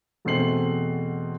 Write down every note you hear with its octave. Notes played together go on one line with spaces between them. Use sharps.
E2 B2 A3 C4 C7 F#7